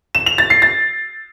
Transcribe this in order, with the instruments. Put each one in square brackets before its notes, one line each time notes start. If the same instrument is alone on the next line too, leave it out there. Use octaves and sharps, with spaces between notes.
[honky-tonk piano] E7
F7
A6
C7
A6